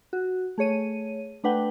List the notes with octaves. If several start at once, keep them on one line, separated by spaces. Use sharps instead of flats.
F#4
A3 G#4 C#5 D#7
A3 D4 B4 F#5 G5